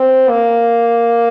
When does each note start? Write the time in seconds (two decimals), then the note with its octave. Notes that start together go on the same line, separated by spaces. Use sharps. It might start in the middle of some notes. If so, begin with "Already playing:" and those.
Already playing: C4
0.29 A#3